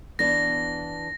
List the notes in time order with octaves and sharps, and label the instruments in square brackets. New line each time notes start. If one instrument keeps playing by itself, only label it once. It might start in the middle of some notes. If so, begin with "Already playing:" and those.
[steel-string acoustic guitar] E3 B3 D4 [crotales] A#6